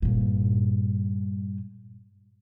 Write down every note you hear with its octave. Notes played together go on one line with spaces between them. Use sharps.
G2 A#2